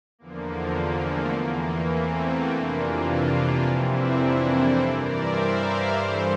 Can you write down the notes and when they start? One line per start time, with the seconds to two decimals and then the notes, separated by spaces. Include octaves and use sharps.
0.19 E2 D3 F3 A#3
1.06 A3
1.34 E2 E3 A#3
1.64 A#3
1.92 A3 C4
2.49 F2 C3 E3 A#3 D4
2.78 D4 F4
3.65 F2 C3 E3 C4 E4
3.94 A#3 D4
4.51 A4 C5
4.81 G2 E3 A#4 D5
5.10 C5 E5
5.38 D5 F5
5.96 G2 E3 A4 C5